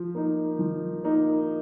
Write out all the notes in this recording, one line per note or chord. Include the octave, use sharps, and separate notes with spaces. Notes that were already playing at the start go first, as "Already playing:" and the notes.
Already playing: F3
A#3 D#4
F3
A#3 D#4